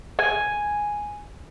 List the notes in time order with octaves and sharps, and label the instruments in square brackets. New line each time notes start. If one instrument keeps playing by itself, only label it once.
[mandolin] G#5